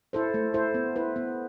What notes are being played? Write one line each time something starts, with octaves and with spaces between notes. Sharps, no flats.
E4 A4 C5
A3
E4 A4 C5
B3
E4 B4
B3